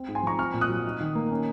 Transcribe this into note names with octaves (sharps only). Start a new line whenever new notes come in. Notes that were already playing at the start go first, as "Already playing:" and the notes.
Already playing: C4
G#2
G#5 C6
F3 A#5 C#6
C4 C#6 F6
A#2
D#6 F#6
F#3
D#4
D#3
A#3
C#4